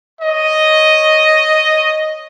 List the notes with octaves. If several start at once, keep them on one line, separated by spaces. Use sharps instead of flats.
C#5 D#5